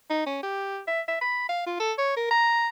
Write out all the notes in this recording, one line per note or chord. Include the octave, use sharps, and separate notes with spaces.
D#4
C#4
G4
E5
E5
B5
F5
F4
A4
C#5
A#4
A#5